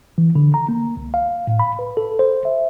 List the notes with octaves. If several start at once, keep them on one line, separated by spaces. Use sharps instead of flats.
E3
D3
A#5
A#3
C2
F5
A2
B5
B4
A4
C5
E5